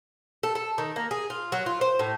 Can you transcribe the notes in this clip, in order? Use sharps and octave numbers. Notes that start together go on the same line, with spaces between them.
A4
A4
D#3
A#3
G#4
F4
F#3
F4
C5
A2